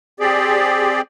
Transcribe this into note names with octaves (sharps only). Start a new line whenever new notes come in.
C4 G4 G#4 D5